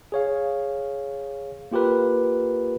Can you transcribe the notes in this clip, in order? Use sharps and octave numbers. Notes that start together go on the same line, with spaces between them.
G#4 C#5 F5
A#3 F4 G4 A#4 B4